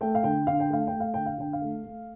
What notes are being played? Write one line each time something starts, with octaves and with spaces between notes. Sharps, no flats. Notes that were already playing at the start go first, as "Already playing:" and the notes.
A3 G5
F5
D3 G5
D3 F5
G5
A3 F5
G5
A3
F5
D3 G5
F5
D3 G5
F5
A3
A3